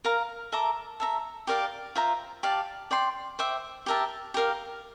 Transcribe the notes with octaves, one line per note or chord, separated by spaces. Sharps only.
A#4 F5 A#5
A4 E5 A#5 D6
A4 E5 A#5
G4 A#4 D5 F5
F4 C5 E5 A#5
G4 D5 F5 A5
D5 G5 C6
C5 E5 G5 D6
G4 A#4 E5 A5
G4 A#4 F5